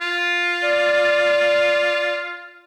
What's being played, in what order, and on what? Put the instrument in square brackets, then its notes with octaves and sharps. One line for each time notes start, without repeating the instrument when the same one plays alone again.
[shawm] F4
[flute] D5